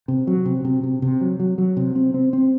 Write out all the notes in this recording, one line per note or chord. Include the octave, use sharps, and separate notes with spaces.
C3
F#3
C3
C3
C3
C3
F#3
F#3
F#3
C3
C4
C4
C4